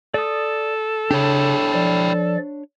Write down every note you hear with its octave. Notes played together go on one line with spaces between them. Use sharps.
A4 D5 D#6
C#3 D4 E4 G4 C#5
F3 D5